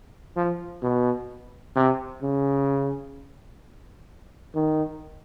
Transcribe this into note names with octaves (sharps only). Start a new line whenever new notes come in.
F3
B2
C3
C#3
D#3